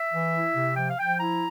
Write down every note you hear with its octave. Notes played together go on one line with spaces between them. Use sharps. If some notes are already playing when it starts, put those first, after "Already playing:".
Already playing: E5
E3
E4
C3
F3 G5
F5
F3 G5
E4 A#5